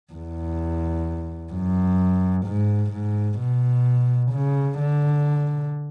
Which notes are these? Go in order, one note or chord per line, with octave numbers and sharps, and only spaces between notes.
E2
F#2
G#2
G#2
B2
C#3
D3